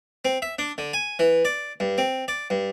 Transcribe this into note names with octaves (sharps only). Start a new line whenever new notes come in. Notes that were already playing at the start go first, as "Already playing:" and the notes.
C4
E5
D4
D3
G#5
E3
D5
G2
C4
D5
G2